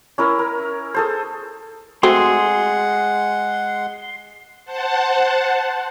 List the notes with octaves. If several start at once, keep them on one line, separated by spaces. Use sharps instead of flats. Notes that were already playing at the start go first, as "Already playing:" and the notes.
C#4 E4 A#4
A#4
G#4 A4 C5
G#3 A3 C4 F#4 G#4 F#5 C6
C5 F#5 A5